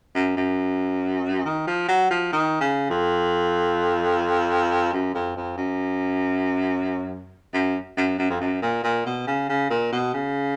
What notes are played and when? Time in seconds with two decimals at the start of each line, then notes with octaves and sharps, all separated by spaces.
0.15 F#2
0.37 F#2
1.45 D#3
1.67 F3
1.88 F#3
2.11 F3
2.32 D#3
2.61 C#3
2.90 F2
4.93 F#2
5.14 F2
5.36 F2
5.58 F#2
7.54 F#2
7.97 F#2
8.19 F#2
8.30 F2
8.41 F#2
8.62 A#2
8.84 A#2
9.06 B2
9.27 C#3
9.49 C#3
9.71 A#2
9.92 B2
10.14 C#3